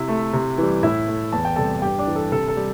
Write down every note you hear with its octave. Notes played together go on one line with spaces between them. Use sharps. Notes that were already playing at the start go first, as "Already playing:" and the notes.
Already playing: C3 E4
A3
C3
E3 G3
A2 E4 E5
A3
E2 A5
G5
C3 G3 A4 A5
G2 G4 G5
D4 D5
E3 G3
A4
C3 A4
A4
G3